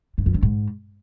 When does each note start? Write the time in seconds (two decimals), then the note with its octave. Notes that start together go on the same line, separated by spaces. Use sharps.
0.18 G2
0.26 F2
0.34 D3
0.43 G#2